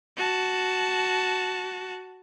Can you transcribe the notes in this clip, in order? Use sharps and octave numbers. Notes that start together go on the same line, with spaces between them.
F#4 A5